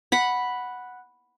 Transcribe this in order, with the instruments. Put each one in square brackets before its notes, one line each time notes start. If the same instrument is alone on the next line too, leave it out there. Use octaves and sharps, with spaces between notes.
[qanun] F#5 B5